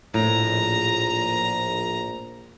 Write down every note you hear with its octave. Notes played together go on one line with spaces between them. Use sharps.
A#1 A2 A#5